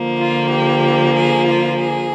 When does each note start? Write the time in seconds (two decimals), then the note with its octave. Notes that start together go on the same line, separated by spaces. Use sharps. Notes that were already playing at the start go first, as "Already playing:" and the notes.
Already playing: D3 F3 A#3
0.18 F4
0.50 G4
1.15 G#4
1.46 F4
1.79 G#4